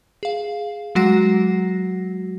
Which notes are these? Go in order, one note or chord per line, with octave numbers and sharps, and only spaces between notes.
G#4 F5
F#3 G#3 F#4 F#5 A#6 C7